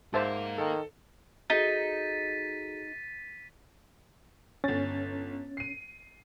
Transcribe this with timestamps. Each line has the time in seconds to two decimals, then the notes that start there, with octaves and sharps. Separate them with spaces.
0.14 G#2 A#4 C5 E5 F5 A5
0.58 D#3 A4
1.50 D#4 F#4 G#4 A4 A6 B6 D#7
4.64 G1 C#4 A6
5.57 C7 D#7